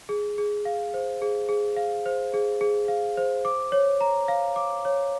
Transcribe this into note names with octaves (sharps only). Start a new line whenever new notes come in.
G#4
G#4
F5
C5
G#4
G#4
F5
C5
G#4
G#4
F5
C5
D6
C#5
A#5
F5
D6
C#5